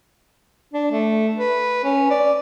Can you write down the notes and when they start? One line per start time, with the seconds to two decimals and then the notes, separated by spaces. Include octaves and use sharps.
0.73 D4
0.92 A3
1.39 B4
1.84 C#4
2.10 D5